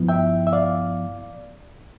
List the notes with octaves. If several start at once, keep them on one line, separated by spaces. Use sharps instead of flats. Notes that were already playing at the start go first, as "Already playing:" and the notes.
Already playing: G2 F3 B3 E4
E5 G5
E5
D5 F5